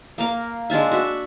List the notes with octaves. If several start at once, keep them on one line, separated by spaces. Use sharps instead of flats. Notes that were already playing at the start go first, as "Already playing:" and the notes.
A#3 A#4 F5
G#3 D4 F4 E5
F#4 E5